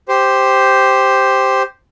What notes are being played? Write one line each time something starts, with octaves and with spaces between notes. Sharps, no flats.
G4 C5